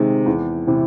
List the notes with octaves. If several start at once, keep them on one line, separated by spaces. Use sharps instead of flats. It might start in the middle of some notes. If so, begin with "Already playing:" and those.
Already playing: C3 D#3 G#3
E2
C3 E3